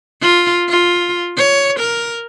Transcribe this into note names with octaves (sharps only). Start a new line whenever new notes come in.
F4
F4
C#5
A#4